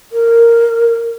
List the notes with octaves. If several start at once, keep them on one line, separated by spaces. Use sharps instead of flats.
A#4